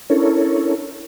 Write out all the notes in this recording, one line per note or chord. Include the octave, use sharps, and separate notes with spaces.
C#4 D4 E4 A4 A#4 C#5